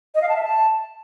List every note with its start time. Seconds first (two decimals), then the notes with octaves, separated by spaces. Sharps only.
0.15 D#5
0.22 F5
0.29 A5
0.36 E5
0.43 A5